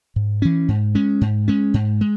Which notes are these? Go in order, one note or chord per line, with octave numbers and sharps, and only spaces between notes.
G#2
E3 C#4
G#2
G#3 C#4
G#2
G#3 C#4
G#2
G#3